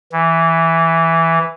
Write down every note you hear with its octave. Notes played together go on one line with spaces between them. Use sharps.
E3